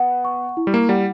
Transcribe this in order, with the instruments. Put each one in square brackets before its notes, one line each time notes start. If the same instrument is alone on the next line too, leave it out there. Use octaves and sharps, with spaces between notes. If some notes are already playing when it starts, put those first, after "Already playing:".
Already playing: [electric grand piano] B3 [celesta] F#5
[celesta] C#6
E4
[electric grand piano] G3
A#3
[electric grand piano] G3 [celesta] F#5